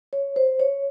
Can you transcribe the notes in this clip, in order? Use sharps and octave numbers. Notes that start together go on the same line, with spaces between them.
C#5
C5
C#5